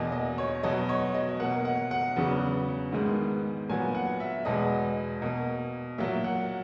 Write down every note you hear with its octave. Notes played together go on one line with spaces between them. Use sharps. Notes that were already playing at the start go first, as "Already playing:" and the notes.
Already playing: E2 B2 A#3 D#5
D#5
C#5
B2 F#3 B3 D#5
C#5
D#5
B2 A#3 F#5
F#5
F#5
E2 C#3 F#3 B3
G#2 D#3 G#3 B3
A#2 F#3 B3 G#5
F#5
E5
E2 B2 G#3 B3 D#5
B2 A#3
A#2 F#3 A#3 E5
F#5